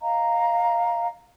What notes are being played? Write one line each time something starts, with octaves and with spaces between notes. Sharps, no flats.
D#5 F5 A#5